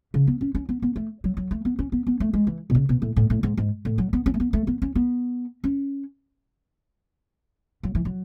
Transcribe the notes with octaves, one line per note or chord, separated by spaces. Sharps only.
C#3
B3
C#4
C#4
B3
B3
A3
F#3
F#3
A3
B3
C#4
B3
B3
A3
G#3
E3
B2
C#3
B2
A2
A2
A2
G#2
G#2
A2
F#3
B3
C#4
A3
B3
A3
B3
C#4
B3
C#4
F#3
E3
F#3